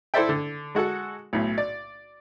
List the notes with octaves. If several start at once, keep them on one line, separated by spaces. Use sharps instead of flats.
E4 A4 C5 D5 E5 G5
D3
G#3 F#4 A4 F#5
B1 A2
D5